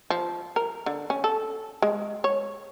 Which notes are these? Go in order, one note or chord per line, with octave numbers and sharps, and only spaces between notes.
F3
A#4
D3
C#4
A4
G#3
C#5